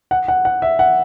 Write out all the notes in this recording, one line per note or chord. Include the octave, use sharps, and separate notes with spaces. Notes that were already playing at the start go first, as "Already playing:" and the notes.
F#5
F#5
F#5
E5
F#5